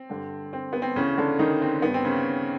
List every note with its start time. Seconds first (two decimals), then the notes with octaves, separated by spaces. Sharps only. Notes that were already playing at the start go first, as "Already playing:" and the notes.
Already playing: C4
0.10 G2 D3
0.53 C4
0.73 B3
0.82 C4
0.96 D2 C#3 E3 C#4
1.18 D3 D4
1.39 D#3 D#4
1.62 C4
1.82 G2 D#3 B3
1.94 C4
2.04 C#3 C#4